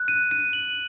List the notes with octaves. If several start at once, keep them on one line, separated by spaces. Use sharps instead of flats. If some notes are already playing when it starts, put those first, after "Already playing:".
Already playing: F#6
D#7
D#7
F#7